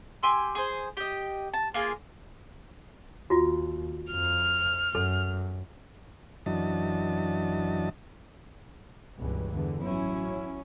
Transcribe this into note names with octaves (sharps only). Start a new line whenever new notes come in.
G4 G#5 C6 E6
G#4 C5
G4 D#5
A5
A#3 F4 G#4
D#2 F4 F#4
F2 F6
F#2 A4
F#2 E3 F#3 D4 D#5 A5
C#2 G2 B2 E3
E2 D3
A1 F#3 C#4 E4